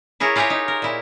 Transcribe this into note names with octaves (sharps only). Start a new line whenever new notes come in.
E4 G#4 A#4 C#5
E4 F4 G4 G#4 A#4 C#5
D#4
A#4
A#2 E4